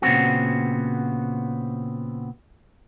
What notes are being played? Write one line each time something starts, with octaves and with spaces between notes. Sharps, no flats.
A#2 C#3 B3 C4 F#4